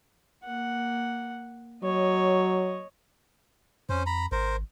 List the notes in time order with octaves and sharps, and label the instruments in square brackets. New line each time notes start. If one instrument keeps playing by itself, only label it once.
[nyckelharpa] A#3 F#5
[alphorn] F#3 [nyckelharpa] C#5 D#5
[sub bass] F2 [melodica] C#4 C5
[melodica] A#5 B5
[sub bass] G#1 [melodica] A#4 C5